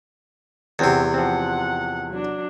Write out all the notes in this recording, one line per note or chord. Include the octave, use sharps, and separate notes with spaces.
E2 C3 C4 F#4
F3 C4 F#5
F#3 D4